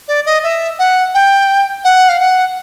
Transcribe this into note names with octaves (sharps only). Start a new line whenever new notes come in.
D5
D#5
E5
F#5
G5
F#5
F5
F#5